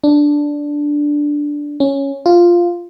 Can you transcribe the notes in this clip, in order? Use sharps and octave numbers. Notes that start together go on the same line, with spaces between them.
D4
C#4
F4